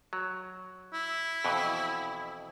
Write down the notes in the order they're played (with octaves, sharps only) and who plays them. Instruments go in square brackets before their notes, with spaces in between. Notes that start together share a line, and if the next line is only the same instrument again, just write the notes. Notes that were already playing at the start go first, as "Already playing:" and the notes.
[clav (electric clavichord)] F#3
[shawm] E4
[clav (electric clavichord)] F2 B2 E3